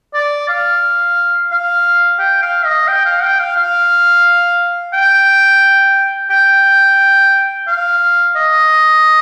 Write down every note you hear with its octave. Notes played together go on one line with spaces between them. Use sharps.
D5
F5
F5
G5
F5
D#5
G5
F5
G5
F5
F5
G5
G5
F5
D#5